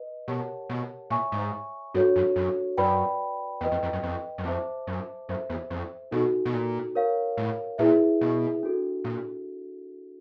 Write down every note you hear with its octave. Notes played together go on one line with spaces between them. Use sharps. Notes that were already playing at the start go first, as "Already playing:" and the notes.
Already playing: B4 D#5
B2 G4 A#4 C#5 F#5 A5
B2
A#2 C#5 E5 G#5 C#6
G#2
G2 D4 F#4 A4 C#5
F#2
F#2
F#2 B4 D5 G5 B5
E2 B4 D#5 G5
F2
F2
F#2
F2
F#2
F2 C5 E5 A5 D6
F#2
F#2 A4 C5 E5
E2
F2
B2 D#4 F#4 A4
B2
A#2
A#4 C#5 F5
A2
A#2 E4 G#4 B4 E5
B2
D4 F#4 A4
A#2